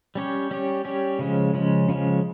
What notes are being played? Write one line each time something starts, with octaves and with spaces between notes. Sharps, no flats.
G3 C#4 G4 C#5
G3 C#4 G4 C#5
G3 C#4 G4 C#5
C#3 F3 G#3 C#4
C#3 F3 G#3 C#4
C#3 F3 G#3 C#4